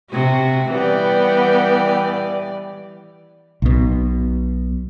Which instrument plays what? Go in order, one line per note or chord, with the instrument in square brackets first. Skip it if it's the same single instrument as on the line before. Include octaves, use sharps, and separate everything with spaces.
[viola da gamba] C3 F#4
[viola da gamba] E3 G3 D5 [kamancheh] B3 G5
[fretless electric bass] B1 B2